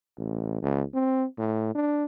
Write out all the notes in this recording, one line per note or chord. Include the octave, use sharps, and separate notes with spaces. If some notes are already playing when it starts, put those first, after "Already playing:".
A1
C#2
C4
A2
D4